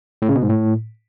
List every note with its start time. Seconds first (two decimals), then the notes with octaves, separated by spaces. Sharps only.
0.22 A2
0.29 C#3
0.35 B2
0.42 G#2
0.49 A2